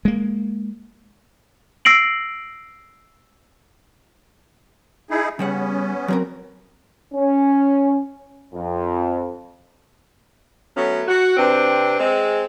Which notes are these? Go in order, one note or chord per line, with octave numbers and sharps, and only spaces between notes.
G#3 A#3
E6 A#6 C7 D7 F#7
D#4 E4 G#4
C#3 G3 B3 C#4 F#5
F#3 C4 A#4
C#4
F2
F#3 A3 B3 C#4
F#4
C3 C4 D4 B4
G#3 C4